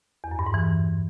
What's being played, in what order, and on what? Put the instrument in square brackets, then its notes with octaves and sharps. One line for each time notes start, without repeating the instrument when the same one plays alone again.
[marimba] E2
F#2
G2
G#2
E3